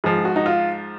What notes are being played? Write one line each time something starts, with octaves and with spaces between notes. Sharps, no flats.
G#2 F3 G#4
F#4
D#4
F4